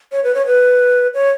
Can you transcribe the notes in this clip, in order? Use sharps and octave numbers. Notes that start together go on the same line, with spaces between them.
C#5
B4
C#5
B4
C#5